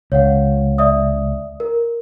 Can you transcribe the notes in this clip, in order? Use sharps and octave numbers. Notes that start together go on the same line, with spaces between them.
C#2 C#5 F5 F#5
D5 E5 D#6
A#4